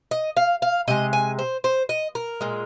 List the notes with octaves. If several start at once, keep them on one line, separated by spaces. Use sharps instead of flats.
D#5
F5
F5
C3 G#3 D#5
G#5
C5
C5
D#5
A#4
A#2 G#3